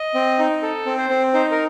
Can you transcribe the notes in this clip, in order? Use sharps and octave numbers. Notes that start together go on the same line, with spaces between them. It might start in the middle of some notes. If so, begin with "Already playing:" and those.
Already playing: D#5
C4
D#4
A4
C4
C5
C4
D#4 C5
A#4